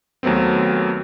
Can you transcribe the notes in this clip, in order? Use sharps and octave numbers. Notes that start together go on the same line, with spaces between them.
D#2 F#3 A3 B3 C4